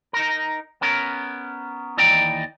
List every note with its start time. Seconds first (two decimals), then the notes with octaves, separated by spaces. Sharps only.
0.13 D#4 A#4
0.81 B3 C#4 A#4
1.97 D#2 E3 D5 D#5 G5 A#5